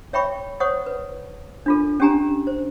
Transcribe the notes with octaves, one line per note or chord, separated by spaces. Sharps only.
C#5 E5 G5 B5 C#6
C5 C#5 F#5 C#6 D#6
B4
D4 F4 A4
C#4 D4 G4 G#5 A#5
C5